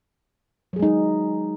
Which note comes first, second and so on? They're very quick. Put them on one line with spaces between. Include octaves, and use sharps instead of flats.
F#3 G#4 G#3 D#4